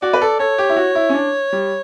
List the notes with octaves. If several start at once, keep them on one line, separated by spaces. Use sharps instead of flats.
F#4 D5
B4
A4
A4 C#5
G4
E4
F#4
E4
C#4
D4
G3